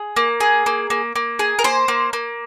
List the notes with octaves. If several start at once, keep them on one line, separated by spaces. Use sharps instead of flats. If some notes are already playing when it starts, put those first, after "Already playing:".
Already playing: G#4
A#3
G#4
A#3
A#3
A#3
G#4
A#4
A#3 C5
A#3
A#3